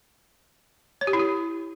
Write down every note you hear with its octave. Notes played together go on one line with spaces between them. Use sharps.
C#5
G4
E4
G4